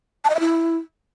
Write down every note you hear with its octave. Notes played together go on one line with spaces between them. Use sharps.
A5
D#5
E5
E4